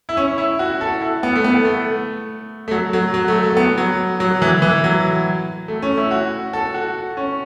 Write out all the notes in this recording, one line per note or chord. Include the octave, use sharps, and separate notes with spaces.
E4
C#4
E4
F#4
A4
E4
B3
A3
B3
A3
A3
F#3
F#3
F#3
A3
A3
B3
F#3
F#3
E3
E3
F#3
A3
C#4
E4
F#4
A4
F#4
C#4